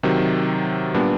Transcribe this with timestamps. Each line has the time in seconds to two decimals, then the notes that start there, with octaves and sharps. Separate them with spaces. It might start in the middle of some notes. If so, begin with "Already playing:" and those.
0.03 C3 D#3 F#3
0.94 A#2 G3 B3 D4